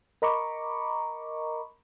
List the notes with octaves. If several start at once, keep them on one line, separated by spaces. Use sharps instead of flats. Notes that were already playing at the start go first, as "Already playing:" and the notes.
A#4 D#5 A#5 B5 C#6 D6